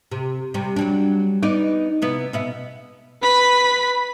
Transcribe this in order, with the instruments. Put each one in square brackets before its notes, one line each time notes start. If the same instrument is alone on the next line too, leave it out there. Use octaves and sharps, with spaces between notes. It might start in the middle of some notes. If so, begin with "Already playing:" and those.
[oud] C3
C3 G3
F#3 G3 D4
B3 D#4 D5
C3 B3 E4
B2 B3 E5
[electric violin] B4 B5